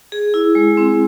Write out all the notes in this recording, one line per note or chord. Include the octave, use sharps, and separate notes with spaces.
G#4
E4
G#3
C4